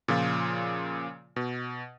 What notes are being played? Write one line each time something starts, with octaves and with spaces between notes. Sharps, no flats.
A#2 C#3 F3 F4
B2